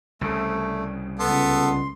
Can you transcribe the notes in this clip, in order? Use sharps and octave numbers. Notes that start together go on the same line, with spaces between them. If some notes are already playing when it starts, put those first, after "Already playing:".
C2 C#3 A3
C#2 B3 A4 C6